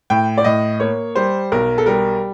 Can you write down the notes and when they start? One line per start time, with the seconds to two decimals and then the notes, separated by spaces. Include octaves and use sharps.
0.10 A2 G5
0.38 D5
0.44 A2 D#5
0.80 A#3 C#5
1.15 G3 C5
1.52 B1 A#4
1.78 A4
1.86 G3 A#4